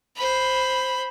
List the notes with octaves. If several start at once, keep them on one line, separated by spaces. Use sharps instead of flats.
C5 B5